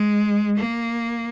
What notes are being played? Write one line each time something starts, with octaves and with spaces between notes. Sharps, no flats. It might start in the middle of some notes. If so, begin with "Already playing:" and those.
Already playing: G#3
A#3